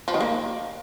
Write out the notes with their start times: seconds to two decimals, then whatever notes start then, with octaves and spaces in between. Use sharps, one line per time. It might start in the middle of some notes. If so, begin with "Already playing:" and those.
0.08 F3
0.14 D#3
0.21 A#3